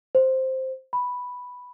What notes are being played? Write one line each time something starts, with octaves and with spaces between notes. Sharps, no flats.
C5
B5